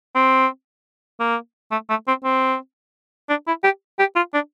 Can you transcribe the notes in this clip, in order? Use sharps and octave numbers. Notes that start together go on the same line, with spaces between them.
C4
A#3
A3
A3
C4
C4
D4
E4
G4
G4
F4
D4